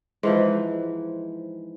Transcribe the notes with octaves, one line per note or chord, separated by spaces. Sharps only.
G#2 E3 F3